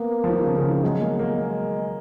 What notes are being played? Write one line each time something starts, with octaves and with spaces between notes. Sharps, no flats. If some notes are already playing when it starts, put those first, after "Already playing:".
Already playing: A#3 B3
F3
D#3
C#3
C#3
D#3
F#3 G#3
A#3
A#3
G#3